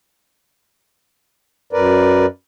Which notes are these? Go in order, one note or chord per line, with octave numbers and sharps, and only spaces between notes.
F#2 A#4 B4 D5